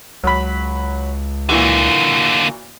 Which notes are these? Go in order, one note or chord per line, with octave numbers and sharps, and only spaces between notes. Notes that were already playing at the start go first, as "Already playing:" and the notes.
C#2 F#3 B5
A#2 D3 E3 A#3 F#4